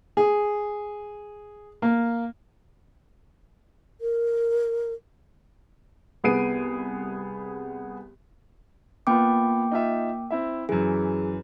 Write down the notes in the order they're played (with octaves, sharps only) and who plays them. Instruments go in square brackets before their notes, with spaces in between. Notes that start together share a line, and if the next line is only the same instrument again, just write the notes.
[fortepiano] G#4
A#3
[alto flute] A#4
[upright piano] C2 B3 G#4 C7 D7 D#7
[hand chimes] A#3 G5 D6 [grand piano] B3 F4 B4
[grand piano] D#4 F4 E5
C4 E4 E5
[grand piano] F#2 E3 [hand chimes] G#4